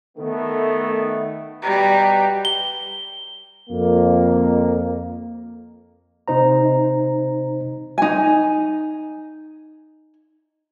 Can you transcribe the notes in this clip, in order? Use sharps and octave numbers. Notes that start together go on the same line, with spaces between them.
D#3 A3 B3
B2 G3 B4 A#5
G7
F2 A#3
C3 D#4 C5 A#5
D#4 G#5